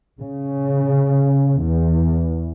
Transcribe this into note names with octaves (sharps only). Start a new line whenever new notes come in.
C#3
E2